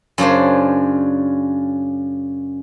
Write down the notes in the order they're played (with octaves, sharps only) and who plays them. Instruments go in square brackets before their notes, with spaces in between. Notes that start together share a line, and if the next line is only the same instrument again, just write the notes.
[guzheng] F#2 C#3 D4 C5